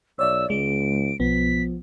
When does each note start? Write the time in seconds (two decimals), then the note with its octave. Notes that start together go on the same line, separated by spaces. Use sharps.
0.19 B1 C#5 D5 E5 E6
0.50 C#2 G#3 D7
1.20 B1 F3 B3 B6